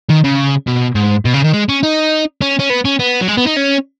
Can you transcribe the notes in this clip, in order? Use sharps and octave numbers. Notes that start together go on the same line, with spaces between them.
D#3
C#3
B2
G#2
B2
C#3
D#3
G#3
C#4
D#4
C#4
C#4
B3
C#4
B3
F#3
G#3
B3
D#4
C#4